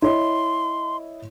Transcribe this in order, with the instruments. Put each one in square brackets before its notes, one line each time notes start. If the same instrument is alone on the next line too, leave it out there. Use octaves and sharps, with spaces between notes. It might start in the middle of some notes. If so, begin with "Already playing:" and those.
[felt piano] E4 C#5 D#5 [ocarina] C6